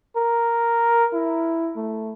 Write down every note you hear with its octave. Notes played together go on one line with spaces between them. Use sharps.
A#4
E4
A3